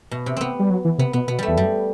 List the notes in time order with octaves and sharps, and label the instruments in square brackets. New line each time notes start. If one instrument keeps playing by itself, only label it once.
[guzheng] B2
C3
B3 C4
[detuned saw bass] G3
F#3
E3
[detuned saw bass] C3 [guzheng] B3
[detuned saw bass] B2 [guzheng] B3
[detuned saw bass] B2 [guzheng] B3
[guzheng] G3 A3
[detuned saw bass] E2
[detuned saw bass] F#2 [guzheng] G3